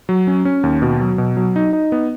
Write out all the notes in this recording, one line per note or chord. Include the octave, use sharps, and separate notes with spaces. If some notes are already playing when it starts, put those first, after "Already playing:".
F#3
C#4
C#4
D#2
B2
F#3
B2
F#3
D#4
D#4
B3